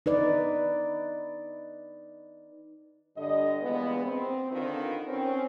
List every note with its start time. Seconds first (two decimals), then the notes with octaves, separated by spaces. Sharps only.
0.06 D#4 B4 D5
3.17 G2 D3 D#5
3.62 G2 A#2 E3 G#3 B3
4.04 C4
4.52 D3 D#3 D4 F4 A#4 B4
5.08 C4 C#4